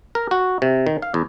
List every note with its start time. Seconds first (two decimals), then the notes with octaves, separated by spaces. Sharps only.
0.15 A#4
0.31 F#4
0.62 C3
0.87 D#3
1.02 F5
1.14 E2